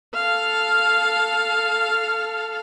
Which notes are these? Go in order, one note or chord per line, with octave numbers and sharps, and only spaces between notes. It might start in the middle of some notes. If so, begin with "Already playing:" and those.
A4 F5